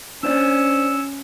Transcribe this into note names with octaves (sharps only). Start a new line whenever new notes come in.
C#4 D4 C5 D5 E6